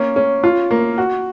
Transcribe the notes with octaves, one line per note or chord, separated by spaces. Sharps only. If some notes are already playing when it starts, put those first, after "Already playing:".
Already playing: A#3 C#4
C#4
F4
A#3
F#4